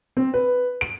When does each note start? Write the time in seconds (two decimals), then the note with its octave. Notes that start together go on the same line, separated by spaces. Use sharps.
0.17 C4
0.34 B4
0.81 D7